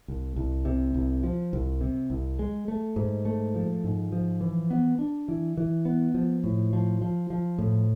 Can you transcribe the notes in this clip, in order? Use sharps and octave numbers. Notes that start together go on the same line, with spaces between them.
C2
C2
C3
C2
F3
C2
C3
C2
G#3
A3
G#2
A3
F3
G#2
F3
E3
B3
D4
E3
E3
B3
F3
A2
F3
F3
F3
A2